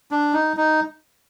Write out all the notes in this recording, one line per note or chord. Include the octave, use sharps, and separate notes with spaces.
D4
D#4
D#4